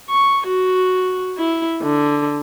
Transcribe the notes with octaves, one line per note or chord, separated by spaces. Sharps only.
C#6
F#4
E4
D3